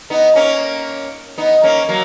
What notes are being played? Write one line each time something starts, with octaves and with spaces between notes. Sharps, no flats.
B3 D#4
A#3 C#4
B3 D#4
A#3 C#4
F#3 A#3